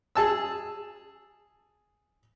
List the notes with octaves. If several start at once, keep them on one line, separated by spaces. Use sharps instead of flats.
G#4 A5 E6